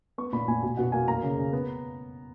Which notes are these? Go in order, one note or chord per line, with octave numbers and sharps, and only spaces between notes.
B3 C#6
A#2 B5
A#2 G#5
B2 G#5
B2 F#5
A#3 G#5
A#3 A#5
C#3
C#3
B3